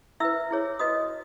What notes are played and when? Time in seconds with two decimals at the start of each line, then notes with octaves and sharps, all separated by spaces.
0.20 E4 B4 E5 E6
0.51 E4 G#4 C#5
0.79 F#4 B4 D#5 D#6